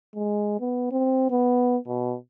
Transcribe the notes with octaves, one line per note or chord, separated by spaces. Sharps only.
G#3
B3
C4
B3
B2